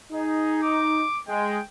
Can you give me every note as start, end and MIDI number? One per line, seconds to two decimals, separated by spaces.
0.13 1.03 63
0.13 0.61 68
0.62 1.20 86
1.28 1.58 56
1.28 1.63 79